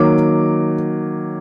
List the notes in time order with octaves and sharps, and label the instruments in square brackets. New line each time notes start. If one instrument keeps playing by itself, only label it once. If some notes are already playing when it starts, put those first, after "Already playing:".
Already playing: [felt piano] D#3 F#3 A#3 D6